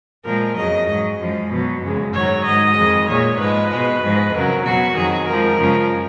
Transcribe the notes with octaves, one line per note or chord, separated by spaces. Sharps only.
A#2 F3 G#3 A#4
F2 C#3 F#3 D#5
G#2 F#3
F#2 F3 G#3
B2 F#3
F#2 C#3 G#3
G#2 D#3 F#3 C#5
G#2 D#3 F#3 D#5
F2 D#3 G#3
A#2 G#3 C#5
G#2 F3 G#3 B4
B2 G#3
G#2 F3 G#3
F2 C#3 F#3 A#4
B2 F#3 F#4
F2 D#3 F#3 G#4
F2 F3 G#3 A#4
F#2 C#3 F3 G#3